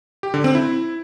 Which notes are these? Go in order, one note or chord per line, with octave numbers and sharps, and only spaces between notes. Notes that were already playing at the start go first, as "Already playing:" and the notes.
G4
D3
C4
E4